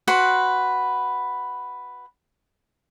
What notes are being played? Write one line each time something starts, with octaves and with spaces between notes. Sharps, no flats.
F#4 B4 C6